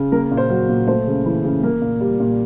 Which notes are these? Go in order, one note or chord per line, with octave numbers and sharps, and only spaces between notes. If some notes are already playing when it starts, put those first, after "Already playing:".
Already playing: C#3
A#3 A#4
A#2
C5
F#3
A#2
A3 C5
C#3
E3
C#3
A#3
A#2
G3
A#2